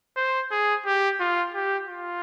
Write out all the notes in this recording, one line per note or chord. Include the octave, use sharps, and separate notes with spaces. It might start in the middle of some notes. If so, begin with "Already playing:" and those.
C5
G#4
G4
F4
G4
F4